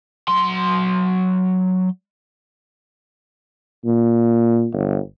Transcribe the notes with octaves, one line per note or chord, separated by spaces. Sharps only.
F#3 C6
A#2
G1